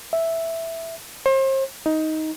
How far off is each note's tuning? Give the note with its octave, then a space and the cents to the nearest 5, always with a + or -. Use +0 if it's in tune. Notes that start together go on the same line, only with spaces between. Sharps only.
E5 +0
C5 +35
D#4 +10